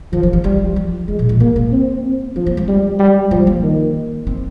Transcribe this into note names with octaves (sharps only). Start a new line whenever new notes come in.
D#3 F3
F3
G3
F3 G3
F3
F3 G#3
A#2
A#2
G#3 A#3
A#3
C4
C4
F3 D4
A#3
G#3
G3
G3
F3 G3
A#3
D#3
C4